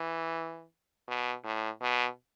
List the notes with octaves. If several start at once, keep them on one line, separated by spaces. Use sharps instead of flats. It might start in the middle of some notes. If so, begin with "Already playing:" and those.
Already playing: E3
B2
A2
B2